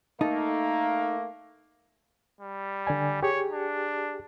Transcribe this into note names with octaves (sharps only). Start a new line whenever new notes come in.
A3 A#3 D#4 A4
G3
D3 D5 G#5
G4 G#4 C#5
D4